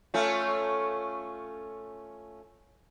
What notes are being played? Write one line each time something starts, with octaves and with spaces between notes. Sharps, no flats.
A3 C#4 F4